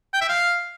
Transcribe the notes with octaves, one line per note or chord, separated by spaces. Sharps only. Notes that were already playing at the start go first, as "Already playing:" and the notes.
G5
E5
F5